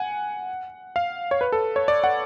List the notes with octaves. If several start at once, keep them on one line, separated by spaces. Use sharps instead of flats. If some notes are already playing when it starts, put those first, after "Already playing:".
Already playing: F#5 G#5
F5
C#5
B4
A4
C#5
D5
F#5